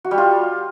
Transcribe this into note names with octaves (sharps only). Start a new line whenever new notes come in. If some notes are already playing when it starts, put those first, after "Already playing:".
F#4
G3
F4